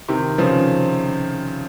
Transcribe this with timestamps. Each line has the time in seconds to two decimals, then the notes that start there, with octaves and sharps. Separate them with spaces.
0.08 C3 D#3
0.38 C#3 F3